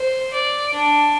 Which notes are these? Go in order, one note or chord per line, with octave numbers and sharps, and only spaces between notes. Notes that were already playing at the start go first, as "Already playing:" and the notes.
Already playing: C5
D5
D4